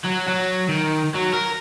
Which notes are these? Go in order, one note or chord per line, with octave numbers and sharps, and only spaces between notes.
F#3
F#3
D#3
F#3
A#4